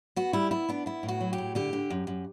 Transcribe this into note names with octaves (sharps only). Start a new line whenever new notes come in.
B3 F#4
G3 E4
B3 E4
B3 D4
B3 E4
A2
F#4
F#3
G4
A2
D3 G4
D3
F#2
F#2